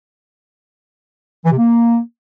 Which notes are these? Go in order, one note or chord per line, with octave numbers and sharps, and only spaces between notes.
E3
C3
A#3